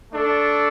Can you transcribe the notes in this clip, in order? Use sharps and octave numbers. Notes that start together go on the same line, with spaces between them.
A3 D4 A4